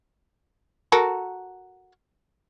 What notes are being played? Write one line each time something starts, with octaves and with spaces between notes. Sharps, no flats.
F#4 A4 A#4